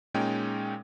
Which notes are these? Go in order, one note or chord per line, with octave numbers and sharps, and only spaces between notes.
A#2 G#3 C#4 D#4 G5